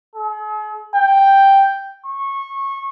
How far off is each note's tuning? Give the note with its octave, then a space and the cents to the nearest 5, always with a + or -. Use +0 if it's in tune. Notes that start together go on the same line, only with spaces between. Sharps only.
G#4 +45
G5 +0
C#6 -20